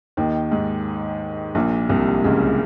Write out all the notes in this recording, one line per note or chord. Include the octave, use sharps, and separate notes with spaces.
D#2 D#3
G#2
A#1 A#2
C2 C3
C#2 C#3